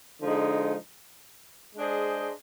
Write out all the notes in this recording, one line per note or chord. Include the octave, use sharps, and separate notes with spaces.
D3 F3 G#3 D#4
G#3 D4 G#4 C5 D#5